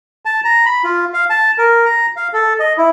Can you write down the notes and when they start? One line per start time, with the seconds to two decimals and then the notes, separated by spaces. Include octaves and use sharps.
0.25 A5
0.45 A#5
0.66 B5
0.84 F4
1.14 F5
1.30 A5
1.59 A#4
1.86 A#5
2.17 F5
2.33 A4
2.60 D#5
2.78 E4